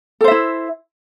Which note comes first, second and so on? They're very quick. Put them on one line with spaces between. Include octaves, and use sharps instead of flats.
A4 C5 E5 E4